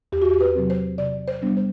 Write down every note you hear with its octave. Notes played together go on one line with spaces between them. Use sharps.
E2 G4
F#4
G4
B4
C3 F#3 C4
C5
C3 D5
C5
G3 B3 D4
C5